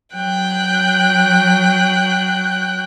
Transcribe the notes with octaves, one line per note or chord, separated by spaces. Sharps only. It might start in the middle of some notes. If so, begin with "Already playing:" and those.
F#3 G5 F#6